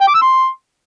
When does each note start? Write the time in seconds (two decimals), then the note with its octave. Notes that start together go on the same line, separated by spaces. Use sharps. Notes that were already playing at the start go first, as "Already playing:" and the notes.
0.01 G5
0.08 D6
0.15 E6
0.22 C6